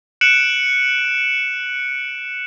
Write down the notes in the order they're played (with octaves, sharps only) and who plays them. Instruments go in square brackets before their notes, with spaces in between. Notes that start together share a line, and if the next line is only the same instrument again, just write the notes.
[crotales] F#6 C#7 D7 E7 F#7